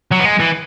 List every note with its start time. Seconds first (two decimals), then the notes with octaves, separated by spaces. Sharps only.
0.11 F#3
0.20 B3
0.25 G#3
0.40 E3